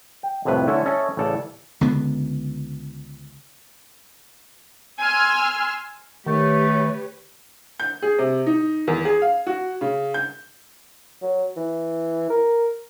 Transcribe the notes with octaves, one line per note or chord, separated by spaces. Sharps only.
G5
C2 F2 A2 C3 B4
D3 A3 C#4 E4 A4
C#4 A4 D#5 E5
A1 C#3 A4 C#5 D5
C#2 D3 B3
G#5 C6 E6 F6
D#3 A3 G4 B4 C#5
G6
G#4
C3
D#4
E2
G#4
F5
F#4
C#3
G6
F#3
E3
A#4